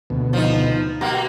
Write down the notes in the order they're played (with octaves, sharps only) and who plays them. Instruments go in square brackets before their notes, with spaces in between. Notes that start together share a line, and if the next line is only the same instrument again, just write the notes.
[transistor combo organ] D2 B2
[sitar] F3 D#4
[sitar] B2 A#3 [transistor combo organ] G4 A#5